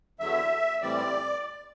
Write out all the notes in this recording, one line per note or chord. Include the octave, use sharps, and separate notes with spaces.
E2 D3 F#3 E5
A2 E3 G3 C4 D5